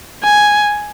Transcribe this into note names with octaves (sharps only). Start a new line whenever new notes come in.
G#5